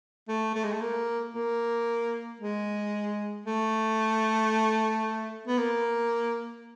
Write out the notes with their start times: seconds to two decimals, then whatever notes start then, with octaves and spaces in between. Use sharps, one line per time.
0.28 A3
0.55 A3
0.64 G#3
0.72 A3
0.81 A#3
1.34 A#3
2.40 G#3
3.46 A3
5.47 B3
5.58 A#3